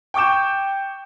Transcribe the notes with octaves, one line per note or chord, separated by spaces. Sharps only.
G5 C#6 D6 G6 E7